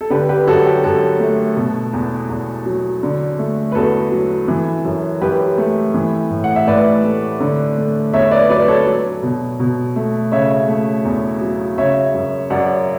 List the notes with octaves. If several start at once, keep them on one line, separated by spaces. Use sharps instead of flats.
A4
D3 G4 B4
G4 B4
F#2 F#4 A4
G4
F#2 F#4 A4
A3
B2
E2
E2
F#3
D3
A3
B4
E2 F#4 A4
F#3
E3
F#2
F#2 G4 B4
A3
E3
A2
F#5
E5
A2 B4 D5
A3
D3
A3
E2 C#5 E5
B4 D5
F#3 B4 D5
A4 C#5
F#3
B2
B2
A3
C#3 C#5 E5
A3
E2
F#3
C#3 C#5 E5
F#2
F#2 D5 F#5